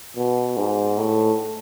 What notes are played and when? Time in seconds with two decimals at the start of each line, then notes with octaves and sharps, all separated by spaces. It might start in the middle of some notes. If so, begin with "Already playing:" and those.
0.17 B2
0.57 G#2
0.98 A2